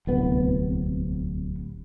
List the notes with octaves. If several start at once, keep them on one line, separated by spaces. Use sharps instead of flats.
D1 C2 B3